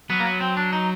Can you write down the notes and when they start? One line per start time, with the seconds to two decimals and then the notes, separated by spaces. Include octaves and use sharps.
0.10 F#3 B3
0.20 A#3
0.26 B3
0.41 C4
0.57 D4
0.73 D#4